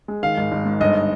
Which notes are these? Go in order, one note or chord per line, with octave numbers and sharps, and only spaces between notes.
G#3
D#3 F5
G#1
G#1
G#2
G1 D#5